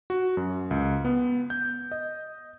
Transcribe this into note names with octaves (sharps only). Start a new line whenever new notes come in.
F#4
F#2
C#2
B3
G6
D#5